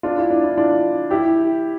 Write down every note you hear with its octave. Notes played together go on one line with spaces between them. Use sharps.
D4 F4
E4
D4
E4
D4 F4
E4 G4